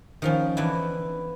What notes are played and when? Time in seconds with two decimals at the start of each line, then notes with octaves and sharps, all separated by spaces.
0.22 D#3 F3 C#4
0.57 D3 E3 B3 D4 E4